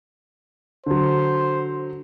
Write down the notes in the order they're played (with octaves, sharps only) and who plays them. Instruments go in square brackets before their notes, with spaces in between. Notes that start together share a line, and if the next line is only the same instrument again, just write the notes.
[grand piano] D3 F#3 [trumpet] C5